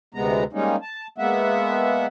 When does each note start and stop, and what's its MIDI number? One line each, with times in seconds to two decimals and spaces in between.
0.14 0.44 38
0.14 0.44 48
0.14 0.44 56
0.14 0.44 59
0.14 0.44 82
0.53 0.76 55
0.53 0.76 56
0.53 0.76 58
0.53 0.76 61
0.53 0.76 63
0.82 1.07 81
1.18 2.06 56
1.18 2.06 58
1.18 2.06 59
1.18 2.06 76
1.18 2.06 78